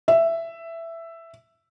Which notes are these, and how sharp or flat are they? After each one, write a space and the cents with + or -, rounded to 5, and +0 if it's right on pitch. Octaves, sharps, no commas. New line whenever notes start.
E5 +10